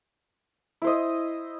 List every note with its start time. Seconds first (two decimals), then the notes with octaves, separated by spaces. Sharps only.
0.82 E4
0.84 C5
0.87 D#5